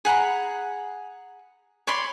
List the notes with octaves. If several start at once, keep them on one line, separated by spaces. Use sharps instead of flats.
G#4 F#5 A#5 B5
C#5 D5 B5 C6